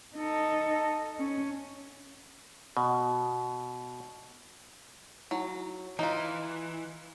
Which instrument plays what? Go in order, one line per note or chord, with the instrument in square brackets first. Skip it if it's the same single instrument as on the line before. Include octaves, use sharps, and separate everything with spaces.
[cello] D#4 A4
C#4
[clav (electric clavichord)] B2
[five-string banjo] F#3 [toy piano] D#4 E4
[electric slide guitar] E3 [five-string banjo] D#4 F4 [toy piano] A#5